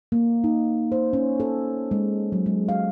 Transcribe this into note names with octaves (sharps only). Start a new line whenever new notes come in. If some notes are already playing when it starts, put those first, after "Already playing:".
A#3
D#4
C5
C#4
A4
G#3
F#3
G#3
F5